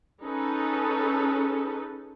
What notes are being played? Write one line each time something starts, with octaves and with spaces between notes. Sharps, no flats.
C#4 D#4 G#4 A4 B4